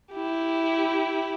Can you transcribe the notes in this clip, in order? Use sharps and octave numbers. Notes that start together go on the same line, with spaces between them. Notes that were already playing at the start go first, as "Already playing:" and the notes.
E4 G4